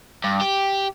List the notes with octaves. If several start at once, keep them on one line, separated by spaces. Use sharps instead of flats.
G2
G4